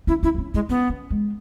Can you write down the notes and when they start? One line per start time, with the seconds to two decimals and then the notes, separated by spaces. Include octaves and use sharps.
0.07 C#4 E4
0.23 C#4 E4
0.34 B3
0.38 C#4
0.54 G#3 E4
0.69 B3 C#4
0.90 C#4
1.11 G#3